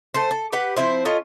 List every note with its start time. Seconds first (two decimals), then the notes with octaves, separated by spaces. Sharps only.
0.14 A3 A4 C5
0.31 A4
0.52 G4 B4 F#5
0.76 F3 C4 E4 C5
1.05 C#4 F4 A4 D#5